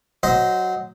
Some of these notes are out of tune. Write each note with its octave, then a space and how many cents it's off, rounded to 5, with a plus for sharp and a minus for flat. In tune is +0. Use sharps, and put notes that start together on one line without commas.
F#3 +0 C5 -15 D#5 +5